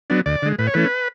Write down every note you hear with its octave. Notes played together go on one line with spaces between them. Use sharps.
F#3 B3 D4
D2 D5
D3 G#3
A2 B4
C#5
E3 A3 C#4 B4